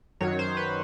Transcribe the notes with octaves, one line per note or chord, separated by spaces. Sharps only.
F#2 D#3 F#3 C#5
C5
B4